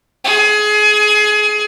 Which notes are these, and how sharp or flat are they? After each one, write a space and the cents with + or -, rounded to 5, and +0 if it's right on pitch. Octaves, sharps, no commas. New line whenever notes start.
G#4 +25